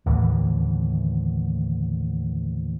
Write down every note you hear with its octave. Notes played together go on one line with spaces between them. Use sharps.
D#2 A2 D3 E3